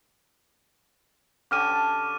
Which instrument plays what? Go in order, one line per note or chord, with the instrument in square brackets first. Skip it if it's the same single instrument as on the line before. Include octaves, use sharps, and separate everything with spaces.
[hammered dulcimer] D3 C#4 G4 [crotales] D6 F6 D#7
[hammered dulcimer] A5